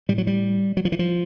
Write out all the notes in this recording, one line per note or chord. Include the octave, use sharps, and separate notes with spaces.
A2 G3
F#3
G3
F#3
F3
E3
F3